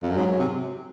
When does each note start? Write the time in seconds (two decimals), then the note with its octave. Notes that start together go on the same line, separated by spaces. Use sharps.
0.03 F2
0.10 F#2
0.16 G#2 F#3
0.39 C3